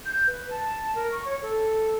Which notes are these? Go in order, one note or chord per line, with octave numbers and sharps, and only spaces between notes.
G6
B4
A5
A#4
C#6
C#5
A4